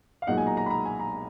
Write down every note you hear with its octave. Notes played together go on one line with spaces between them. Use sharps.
F5
B1 A#2 G#3 D#4 F#5
G#5
A#5
A#5
B5
A#5
G#5
A#5